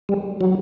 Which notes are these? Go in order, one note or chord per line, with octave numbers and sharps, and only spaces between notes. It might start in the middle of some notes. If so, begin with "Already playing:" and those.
G3
F#3